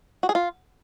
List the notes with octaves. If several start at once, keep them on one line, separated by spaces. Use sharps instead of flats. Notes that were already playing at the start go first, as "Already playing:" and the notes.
F#4
G#4
F4